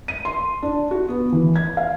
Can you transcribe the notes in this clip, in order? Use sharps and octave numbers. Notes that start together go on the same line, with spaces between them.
D#7
C6
D4
F#4
B3
E3
G#6
F5